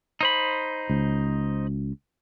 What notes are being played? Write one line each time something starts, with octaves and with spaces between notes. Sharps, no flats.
D#4 C5 B5
C#2